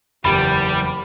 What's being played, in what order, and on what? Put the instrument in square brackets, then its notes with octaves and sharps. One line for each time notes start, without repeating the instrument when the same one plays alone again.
[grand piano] F#1 E2 [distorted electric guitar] G3 [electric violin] G4 [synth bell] B5